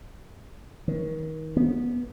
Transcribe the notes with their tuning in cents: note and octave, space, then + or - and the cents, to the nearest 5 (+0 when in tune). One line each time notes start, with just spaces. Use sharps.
D#3 +30
B3 -20